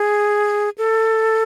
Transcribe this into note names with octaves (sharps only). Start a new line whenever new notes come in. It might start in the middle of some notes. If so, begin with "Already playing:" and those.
Already playing: G#4
A4